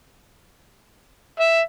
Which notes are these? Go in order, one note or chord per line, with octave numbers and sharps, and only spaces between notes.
E5